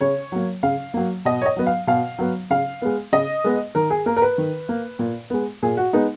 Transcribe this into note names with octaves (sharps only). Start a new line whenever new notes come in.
C#3 C#5
F#3 A#3
C#3 F5
F#3 A#3
B2 D#5
C#5
D#5
F#3 B3
F5
B2 F5
F#3 B3
C#3 F5
G#3 B3
C#3 D#5
G#3 B3
D#3 A#4
G#4
A#3 A#4
A#4
B4
D#3
A#3
A#2
G#3 B3
A#2 G#4
F#4
G#3 B3 D#4